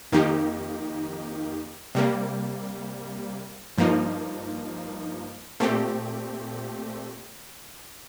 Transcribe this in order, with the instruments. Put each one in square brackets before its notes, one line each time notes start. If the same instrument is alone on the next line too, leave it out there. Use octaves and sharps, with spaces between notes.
[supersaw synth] F2 D#3 A#3 D#4 G4
C3 G3 A#3
G2 F3 A#3 D#4
A#2 A3 C4 G4